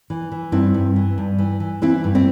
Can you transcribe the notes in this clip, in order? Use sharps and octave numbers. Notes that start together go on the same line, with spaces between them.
E3
E3
G2 C4 E4
G2
E3
G2
E3
E3
E3 C4 E4
G2
C4 E4